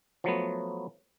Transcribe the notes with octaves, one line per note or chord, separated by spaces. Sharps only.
F3 F#3 A3 B3